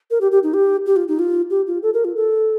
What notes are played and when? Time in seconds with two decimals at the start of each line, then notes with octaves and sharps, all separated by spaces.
0.11 A#4
0.21 G4
0.31 G4
0.43 D#4
0.54 G4
0.86 G4
0.96 F4
1.08 D#4
1.19 F4
1.50 G4
1.67 F4
1.82 A4
1.94 A#4
2.05 F4
2.16 A4